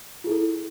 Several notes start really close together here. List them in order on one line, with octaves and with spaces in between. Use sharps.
F4 G#4 E4 A4